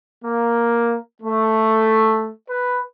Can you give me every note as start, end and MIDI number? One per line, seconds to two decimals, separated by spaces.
0.24 0.98 58
1.23 2.30 57
2.50 2.81 71